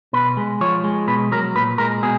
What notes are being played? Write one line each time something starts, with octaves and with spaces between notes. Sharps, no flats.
B2 B4
G#3
F3 C#5
G#3
B2 B4
F#3 A#4
A#2 B4
G#3 A#4
B2 G#4